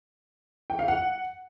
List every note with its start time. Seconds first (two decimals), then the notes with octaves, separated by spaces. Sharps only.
0.70 G5
0.79 F5
0.88 F#5